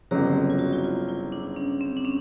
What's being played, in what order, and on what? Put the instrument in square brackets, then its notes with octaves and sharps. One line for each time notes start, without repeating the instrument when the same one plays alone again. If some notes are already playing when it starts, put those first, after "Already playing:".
[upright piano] G1 F2 C#3 F#3 [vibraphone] G4
[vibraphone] F4
F#4
E4
F4
E4
D4
C#4
C4
D4
C#4